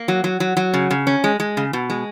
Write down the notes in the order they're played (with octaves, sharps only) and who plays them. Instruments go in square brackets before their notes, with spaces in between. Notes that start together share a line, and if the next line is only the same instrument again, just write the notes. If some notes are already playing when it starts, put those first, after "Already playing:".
Already playing: [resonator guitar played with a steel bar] A#3
F#3
F#3
F#3
F#3
C#3
C#3
C#4
G#3
G#3
C#3
B2
G#3